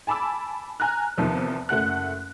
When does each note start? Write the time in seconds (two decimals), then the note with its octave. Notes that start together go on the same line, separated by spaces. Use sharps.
0.07 G#5 A5 B5 D6 E6
0.80 G#5 A#5 F6 F#6
1.17 E2 C3 D#3 F3 C4
1.69 F#1 A3 F#5 F#6